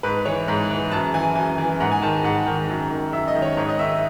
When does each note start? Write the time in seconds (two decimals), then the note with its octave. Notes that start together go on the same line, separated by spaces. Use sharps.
0.03 G#2 B4
0.25 E3 C#5
0.48 G#2
0.70 E3
0.92 F#2 A5
1.14 E3 G#5
1.36 F#2 G#5
1.58 E3
1.80 G#2 F#5
1.92 G#5
2.02 D#3 A5
2.13 G#5
2.24 G#2 F#5
2.46 D#3
2.69 F#2
2.90 D#3
3.12 F#2 E5
3.28 D#5
3.35 D#3
3.42 C#5
3.57 G#2 C#5
3.69 D#5
3.79 D#3 E5